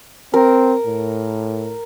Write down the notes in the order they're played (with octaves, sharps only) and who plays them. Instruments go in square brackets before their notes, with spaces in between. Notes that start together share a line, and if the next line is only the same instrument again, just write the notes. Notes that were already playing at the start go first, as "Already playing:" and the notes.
[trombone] C4 [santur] A#4
[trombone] A2